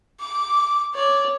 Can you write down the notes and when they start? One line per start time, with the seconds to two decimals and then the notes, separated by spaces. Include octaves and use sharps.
0.20 D6
0.94 C#5 D5